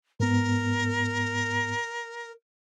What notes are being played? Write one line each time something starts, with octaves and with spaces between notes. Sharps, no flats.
G#2 B3 A#4